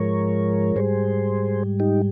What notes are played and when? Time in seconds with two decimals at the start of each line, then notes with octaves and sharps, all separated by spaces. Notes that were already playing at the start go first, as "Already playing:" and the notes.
Already playing: G#2 F3 G#3 A#4 C#5
0.76 G#2 G3 G#4 C5
1.80 D#4 G4